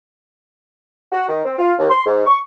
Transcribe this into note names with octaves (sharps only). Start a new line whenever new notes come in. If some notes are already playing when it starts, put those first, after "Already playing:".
F#4
D#3
C4
F4
D#2
C6
G#2
C#6